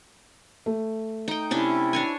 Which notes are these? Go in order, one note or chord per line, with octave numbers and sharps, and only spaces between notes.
A3
D#4 G5
C3 C#4 D4 E4
D4 C#5 G#5